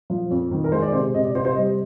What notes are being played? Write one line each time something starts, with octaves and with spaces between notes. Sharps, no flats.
F3
F2
D#3
A#4
G#3 C5
D5
C3 C5
C3 D#5
D5
C3 C5
C5
G3 D#5